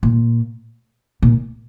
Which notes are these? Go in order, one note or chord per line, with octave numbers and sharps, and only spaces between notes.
A#2
A#2